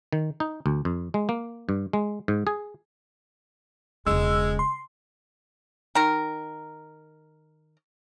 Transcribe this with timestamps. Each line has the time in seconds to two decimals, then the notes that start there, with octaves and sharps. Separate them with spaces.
0.13 D#3
0.40 D#4
0.66 D2
0.85 F2
1.14 G#3
1.29 A#3
1.69 G2
1.93 G#3
2.28 G#2
2.47 G#4
4.07 E1 C#3 G#3 E6
4.59 C6
5.95 D#3 A#4